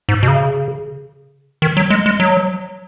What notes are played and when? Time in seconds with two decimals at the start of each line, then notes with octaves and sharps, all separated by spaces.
0.09 G#2
0.23 B2
0.28 C#3
1.62 D#3
1.77 F#3
1.90 G#3
2.06 G#3
2.20 F#3